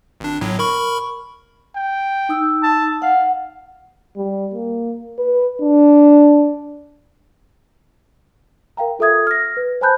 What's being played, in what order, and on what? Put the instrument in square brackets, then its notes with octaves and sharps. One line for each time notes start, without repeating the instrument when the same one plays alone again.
[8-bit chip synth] G#1 D4
G1 A2 F#3
A#4 B5 C#6
[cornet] G5
[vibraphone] D#4 D#6 E6
[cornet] A5
[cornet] F5 [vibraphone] F#5
[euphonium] G3
A#3
B4
D4
[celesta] A#4 F5 G5 A#5
F4 A4 E5 D#6 G#6
F6 A#6
B4
C5 G#5 A5 B5 F#6 G6